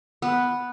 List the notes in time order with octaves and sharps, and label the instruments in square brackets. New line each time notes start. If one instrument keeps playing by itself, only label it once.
[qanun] B3